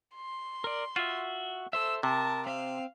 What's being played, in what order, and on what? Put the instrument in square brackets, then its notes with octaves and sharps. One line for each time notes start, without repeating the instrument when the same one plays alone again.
[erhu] C6
[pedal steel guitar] A#4 D5
[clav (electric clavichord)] F4 [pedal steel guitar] F#4 E5
[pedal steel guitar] A4 C5 E5 [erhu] E6
[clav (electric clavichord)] C3 [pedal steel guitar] A#4 [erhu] A5
[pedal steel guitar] C4 [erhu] F5